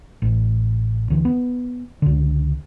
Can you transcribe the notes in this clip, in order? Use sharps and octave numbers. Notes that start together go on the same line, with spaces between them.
A1
D2 E3
B3
C#2 D3